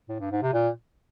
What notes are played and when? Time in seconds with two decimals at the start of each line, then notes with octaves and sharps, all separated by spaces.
0.09 A2
0.20 G2
0.31 G#2
0.43 C3
0.54 A#2